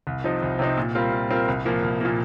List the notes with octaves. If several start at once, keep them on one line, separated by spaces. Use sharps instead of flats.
C2
C3 F3 C4 D#4
C2
C3 F3 C4 D#4
A#2
G3 C4 F4 A#4
A#2
G3 C4 F4 A#4
C2
A#2 F3 A#3
C2
A#2 F3 A#3